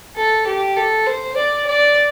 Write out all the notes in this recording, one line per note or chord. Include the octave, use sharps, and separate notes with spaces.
A4
G4
A4
C5
D5
D5